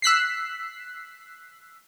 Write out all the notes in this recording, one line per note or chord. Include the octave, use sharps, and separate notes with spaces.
E6 F#6 B6 C7